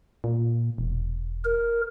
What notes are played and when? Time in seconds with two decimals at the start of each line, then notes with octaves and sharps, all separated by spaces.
0.24 A#2
0.78 E1
1.44 A#4